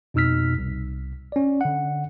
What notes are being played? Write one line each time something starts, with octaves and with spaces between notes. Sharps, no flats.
F2 B2 D#4 E6 F6 B6
C2
C#4 D5
D3 F#5